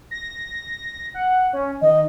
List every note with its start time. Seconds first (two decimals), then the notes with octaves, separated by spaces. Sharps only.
0.11 A#6
1.14 F#5
1.53 C#4
1.82 D#3 D#5